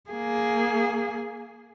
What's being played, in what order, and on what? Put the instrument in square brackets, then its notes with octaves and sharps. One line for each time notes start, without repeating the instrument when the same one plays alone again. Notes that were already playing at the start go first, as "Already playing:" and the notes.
[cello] A#3 G#4